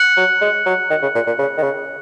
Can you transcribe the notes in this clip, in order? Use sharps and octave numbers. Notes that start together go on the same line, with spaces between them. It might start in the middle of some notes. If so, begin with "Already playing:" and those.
Already playing: F#6 C#7 F#7
F#3
G#3
F#3
D#3
C#3
A#2
A#2
C#3
D#3
C#3